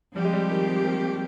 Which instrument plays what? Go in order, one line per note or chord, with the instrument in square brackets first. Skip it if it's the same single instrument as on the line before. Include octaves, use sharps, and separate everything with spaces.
[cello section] F3 C4 G4 [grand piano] G3
[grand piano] G#3
G3
D#3
G#3
A#3